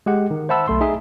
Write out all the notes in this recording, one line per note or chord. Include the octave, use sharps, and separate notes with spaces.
G#3 G4 F#5
D#3
C5 E5 F#5 A5 B5 E6
B1 A3 C6
D#4 G#4 E5